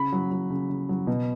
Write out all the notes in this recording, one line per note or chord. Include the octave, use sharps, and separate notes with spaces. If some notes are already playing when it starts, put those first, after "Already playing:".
Already playing: C#3 B5
F#3
F#3
C#3
C#3
F#3
B2